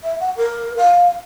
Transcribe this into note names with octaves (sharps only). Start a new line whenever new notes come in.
E5
F#5
A#4
F5